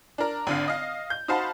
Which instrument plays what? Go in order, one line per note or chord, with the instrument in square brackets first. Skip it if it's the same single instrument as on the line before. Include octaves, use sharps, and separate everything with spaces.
[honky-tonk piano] D4 A#4
G#1 D3 F5
D#5 F5
G6
D#4 F#4 C5 F5 A5 B5